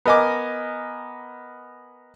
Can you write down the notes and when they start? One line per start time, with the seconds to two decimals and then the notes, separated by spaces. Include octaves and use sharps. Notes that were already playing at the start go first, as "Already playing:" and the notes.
0.05 B3 A#4 D#5 G#5 D6